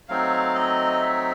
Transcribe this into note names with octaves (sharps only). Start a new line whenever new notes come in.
F#3 A3 C4 D#4 F5
D#5
E5